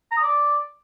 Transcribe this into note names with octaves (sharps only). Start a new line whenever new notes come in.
A#5
D#6
D5